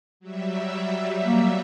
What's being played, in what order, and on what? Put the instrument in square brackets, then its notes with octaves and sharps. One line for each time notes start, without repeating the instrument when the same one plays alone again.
[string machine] F#3 G3 E5
[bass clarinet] A#3